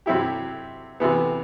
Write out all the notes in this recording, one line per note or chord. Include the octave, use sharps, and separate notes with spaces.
C3 F#3 C4 E4 G4
C3 E3 B3